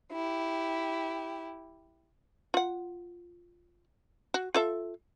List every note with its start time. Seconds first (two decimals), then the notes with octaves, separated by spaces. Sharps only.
0.12 E4 G4
2.54 F4 F#5
4.34 F#4
4.54 F4 A4 E5